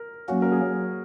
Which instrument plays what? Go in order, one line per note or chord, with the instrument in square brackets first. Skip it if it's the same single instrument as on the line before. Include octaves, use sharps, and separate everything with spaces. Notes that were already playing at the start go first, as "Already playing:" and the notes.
Already playing: [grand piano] A#4
[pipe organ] F#3 A#3 C#4 [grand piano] F#4
[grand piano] A#4
G#4